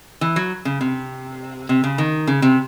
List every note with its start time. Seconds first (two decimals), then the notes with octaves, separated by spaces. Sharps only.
0.21 E3
0.36 F#3
0.65 C#3
0.81 C3
1.69 C3
1.84 C#3
1.98 D#3
2.27 C#3
2.42 C3